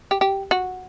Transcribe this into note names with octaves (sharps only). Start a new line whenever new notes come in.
G4
G4
F#4